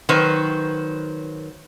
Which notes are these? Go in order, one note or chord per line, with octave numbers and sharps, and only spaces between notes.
D#3 F#3 B4 C5